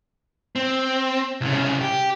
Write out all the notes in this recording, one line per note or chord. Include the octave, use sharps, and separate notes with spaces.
C4
C2 C#3
G4